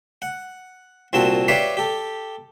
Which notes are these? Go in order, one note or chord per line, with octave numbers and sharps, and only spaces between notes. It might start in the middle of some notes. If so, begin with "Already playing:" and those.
F#5
C2 A#2 C4 F#4 A5
G4 B4 C#5 D5 E5 F5
G4 A4